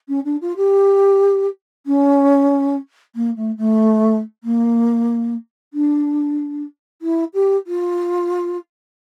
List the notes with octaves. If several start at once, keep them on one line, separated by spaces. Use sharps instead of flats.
C#4
D4
F4
G4
C#4
A#3
A3
A3
A#3
D4
E4
G4
F4